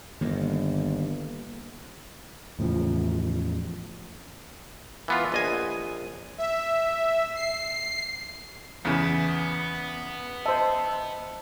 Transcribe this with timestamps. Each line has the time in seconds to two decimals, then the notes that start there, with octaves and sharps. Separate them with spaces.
0.21 G1 D#3 A#3
2.59 E2 A2 C#3 F3
5.08 E3 B3 F4
5.32 A#1 D#5 G#5
6.38 E5
7.35 C7
8.85 E2 C#3 B3
10.46 C5 D#5 E5 A5